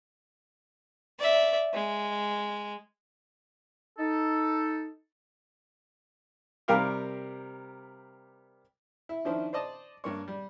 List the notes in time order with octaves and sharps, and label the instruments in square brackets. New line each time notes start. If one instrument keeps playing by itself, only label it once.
[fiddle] D5 E5
G#3
[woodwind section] D#4 A4
[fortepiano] C3 G3 A#4 F5 G5 D6
E4
D#3 F3 C#4 D4 E4 C5
C5 D5 D#5 A5
G2 A#3 C#5
G3